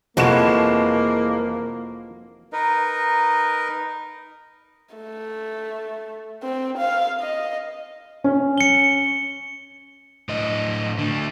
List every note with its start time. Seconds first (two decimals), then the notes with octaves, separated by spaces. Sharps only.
0.17 F1 E3 F3 G#3 A#3 F#4 E7
2.53 D#4 A#4 B4 D#5
4.95 A3
6.43 C4
6.78 F5
7.21 D#5
8.24 C#4
8.58 C#7 G7
10.29 A2 D#5
10.98 D3 A3